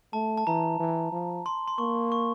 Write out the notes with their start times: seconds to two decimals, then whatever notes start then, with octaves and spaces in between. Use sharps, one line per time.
0.13 A3 A5
0.37 A5
0.47 E3 A#5
0.80 E3
1.12 F3
1.46 C6
1.68 C6
1.78 A#3 C#6
2.12 C#6